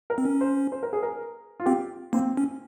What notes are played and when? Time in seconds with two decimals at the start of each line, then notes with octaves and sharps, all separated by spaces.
0.10 A#4
0.18 C4
0.25 C#4
0.41 C5
0.72 C5
0.83 A#4
0.93 G#4
1.03 A#4
1.60 F4
1.66 C4 G4
2.13 A#3 C4
2.37 C#4